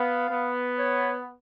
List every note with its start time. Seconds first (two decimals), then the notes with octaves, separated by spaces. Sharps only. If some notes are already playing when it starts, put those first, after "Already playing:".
Already playing: B3 F5
0.30 B3
0.79 C#5